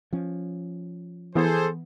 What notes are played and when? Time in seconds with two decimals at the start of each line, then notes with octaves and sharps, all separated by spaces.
0.13 F3 C#4
1.35 E3 B3 G#4 A4 C5